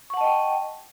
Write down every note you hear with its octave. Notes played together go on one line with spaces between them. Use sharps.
D#5 F#5 G5 A5 C#6